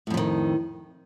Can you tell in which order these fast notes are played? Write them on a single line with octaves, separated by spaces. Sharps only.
A2 F2 F3 D#3